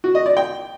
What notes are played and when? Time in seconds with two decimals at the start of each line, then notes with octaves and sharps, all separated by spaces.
0.04 F#4
0.15 D#5
0.26 D5
0.37 G5